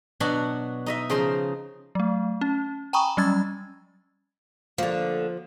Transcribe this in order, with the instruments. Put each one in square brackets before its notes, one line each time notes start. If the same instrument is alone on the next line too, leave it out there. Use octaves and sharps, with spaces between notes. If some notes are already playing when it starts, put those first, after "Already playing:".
[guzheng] B2 F#3 D4 F#4 F#5 A5
D#4 D#5 E5
C#3 F3 C5 A#5 C6
[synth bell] F#3 A3
C#4
G5 G#5 A#5 B5 C#6 D#6
F#3 G3 C#4 E6 G#6 A6
[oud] D3 A#3 [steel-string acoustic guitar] F3